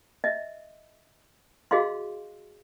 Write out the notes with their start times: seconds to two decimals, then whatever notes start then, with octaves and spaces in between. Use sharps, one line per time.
0.24 D#5 E5
1.71 F#4 G#4 D#5 F5 C6